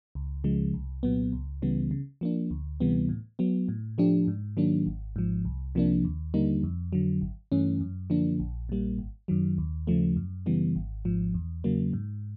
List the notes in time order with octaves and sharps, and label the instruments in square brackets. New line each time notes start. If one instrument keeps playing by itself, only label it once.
[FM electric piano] C#2
C#3 F3 G#3
C2
A#2 F#3 B3
C#2
C#3 E3 G3 B3
C#3
F3 A#3 D4
D2
C3 E3 G3 B3
A2
F#3 B3
A2
F3 A3 D4 G4
G#2
D#3 F#3 A#3 D4
G#1
G#2 F3
C2
C3 F3 A#3 D4
D#2
D3 G3 A#3 D#4
F2
D3 F#3
G#1
G2 E3 A3 C#4
F#2
D3 F3 A#3 D4
A#1
A#2 G3 A#3
G#1
F#2 D#3 F#3
D#2
C#3 F3 A3
F#2
C#3 E3 G3 B3
G#1
G#2 F3
E2
C#3 F#3 A#3
G#2